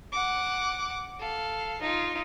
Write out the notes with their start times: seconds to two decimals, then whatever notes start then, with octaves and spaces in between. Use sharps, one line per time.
0.12 F#5 D6
1.20 A4 F5
1.82 D#4 F4